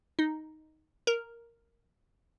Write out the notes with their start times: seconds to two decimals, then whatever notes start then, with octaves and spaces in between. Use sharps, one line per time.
0.19 D#4
1.07 A#4